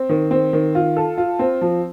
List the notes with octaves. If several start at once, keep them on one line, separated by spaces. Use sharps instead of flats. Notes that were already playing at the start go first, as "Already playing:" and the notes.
Already playing: C4
D#3
C4
D#3
F4
A4
F4
C4
F3